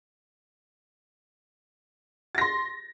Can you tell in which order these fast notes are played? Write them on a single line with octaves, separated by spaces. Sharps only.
A6 A#6 C6